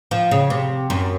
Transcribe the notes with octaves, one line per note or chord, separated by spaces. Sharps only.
F3
C#3
C3
F#2